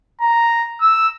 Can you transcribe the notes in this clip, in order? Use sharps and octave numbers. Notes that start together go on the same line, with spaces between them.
A#5
E6